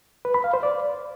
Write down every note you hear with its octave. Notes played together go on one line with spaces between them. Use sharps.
B4
B5
F5
C5
D5